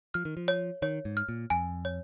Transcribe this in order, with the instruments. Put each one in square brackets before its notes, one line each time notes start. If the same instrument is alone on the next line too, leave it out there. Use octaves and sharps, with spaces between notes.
[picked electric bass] F3 [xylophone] F6
[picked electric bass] D#3
F3
[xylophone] C#5
[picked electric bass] D#3 [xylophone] C#5
[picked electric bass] G#2
[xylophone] F6
[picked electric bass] A#2
[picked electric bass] F2 [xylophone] G#5
[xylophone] C#5